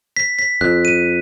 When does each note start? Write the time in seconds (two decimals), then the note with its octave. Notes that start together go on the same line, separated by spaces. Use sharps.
0.17 B6
0.39 B6
0.61 F2 F#6
0.85 D#7